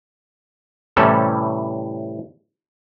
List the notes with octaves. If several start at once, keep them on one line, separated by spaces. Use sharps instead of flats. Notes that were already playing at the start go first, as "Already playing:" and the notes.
A2 C3 E3 G3 C#4 A4